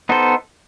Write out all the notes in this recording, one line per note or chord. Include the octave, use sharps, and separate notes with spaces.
B3 D#4 A4 C5